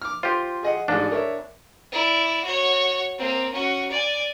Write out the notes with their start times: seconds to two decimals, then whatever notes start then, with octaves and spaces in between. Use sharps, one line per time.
0.02 D6 F6
0.23 F4 G4 C5
0.63 G#4 D#5 F#5
0.88 A1 G#2 D4
1.11 A#4 C#5 E5
1.92 E4 D5
2.44 F#4 C#5
3.18 A#3 C4
3.53 C#4 F#4
3.90 D5 G#5